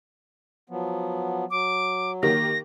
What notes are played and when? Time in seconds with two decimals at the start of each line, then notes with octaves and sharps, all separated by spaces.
0.70 F3 F#3 B3
1.51 F#3 D6
2.23 D#3 A#3 G4 A#6